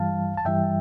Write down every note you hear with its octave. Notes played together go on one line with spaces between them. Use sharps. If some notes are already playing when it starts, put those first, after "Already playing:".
Already playing: G2 E3 G3 F5 A5
A5
G2 E3 G3 E5 G5